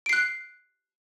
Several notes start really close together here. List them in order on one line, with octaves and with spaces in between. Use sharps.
D7 C7 F#6